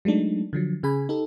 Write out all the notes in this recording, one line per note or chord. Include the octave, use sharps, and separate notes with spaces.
F#3 G#3 A3 D4 D#4
D3 F3 F#3
C#3 G#4 G#5 B5
D#4 G4 A4